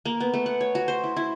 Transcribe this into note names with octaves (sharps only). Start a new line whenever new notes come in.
A#3
B3
A3
F#5
C#5
F#4
C5
E4
E4